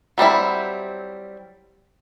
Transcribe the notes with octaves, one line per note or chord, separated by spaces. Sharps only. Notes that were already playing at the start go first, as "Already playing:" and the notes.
F#3 G3 C4 E4